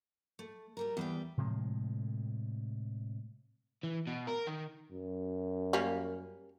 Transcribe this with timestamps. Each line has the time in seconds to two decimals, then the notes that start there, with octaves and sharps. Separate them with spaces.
0.39 A3
0.77 F#3 G3 A#4
0.97 E2 G3 B4 G5
1.37 A2 C3 F3 G#3
3.83 E3
4.07 B2
4.27 A#4
4.47 D#3
4.91 F#2
5.73 G3 A#3 C#4